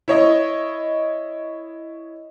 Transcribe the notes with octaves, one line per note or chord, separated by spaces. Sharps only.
E4 C#5 D#5